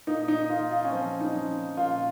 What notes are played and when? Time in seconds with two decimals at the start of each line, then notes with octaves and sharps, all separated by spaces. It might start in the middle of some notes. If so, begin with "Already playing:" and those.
0.07 A#2 D#4
0.28 D#4
0.50 A#2 F4
0.71 F4
0.85 C#4
0.92 F3 C4
1.21 D#4
1.35 F3
1.77 A#2 F4